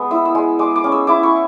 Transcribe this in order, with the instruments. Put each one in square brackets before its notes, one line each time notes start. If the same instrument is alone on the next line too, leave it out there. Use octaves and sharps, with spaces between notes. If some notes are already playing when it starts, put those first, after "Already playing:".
Already playing: [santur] G#3 B3
E4 E6
E6
G#3
G#3 D6
D6
C#4
E6
E4 D6
C#6